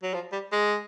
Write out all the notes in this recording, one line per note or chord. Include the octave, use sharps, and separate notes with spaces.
F#3
F3
G3
G#3